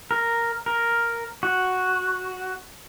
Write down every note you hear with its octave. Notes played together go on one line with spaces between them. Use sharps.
A#4
A#4
F#4